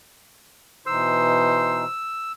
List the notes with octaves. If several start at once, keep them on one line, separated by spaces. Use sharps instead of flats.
B2 E3 D#4 C5 E6